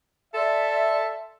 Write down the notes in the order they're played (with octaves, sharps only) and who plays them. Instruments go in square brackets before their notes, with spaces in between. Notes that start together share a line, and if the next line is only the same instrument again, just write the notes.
[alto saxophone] A4 [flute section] D5 C6 [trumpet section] E5